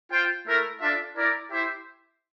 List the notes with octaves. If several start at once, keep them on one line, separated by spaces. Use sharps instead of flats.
F4 C5 G5
A3 E4 A#4
D4 F4 A4 E5
E4 A#4 D5
E4 G4 C5 E5